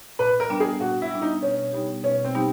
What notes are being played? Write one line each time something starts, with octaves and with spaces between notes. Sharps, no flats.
A#2 B4
A#4
G3 B3 D4
G#4
A#2 F#4
E4
G3 B3 D4
D#4
B2 C#4
G3 B3 D#4 G4
B2 C#4
C4
G3 B3 D#4 G4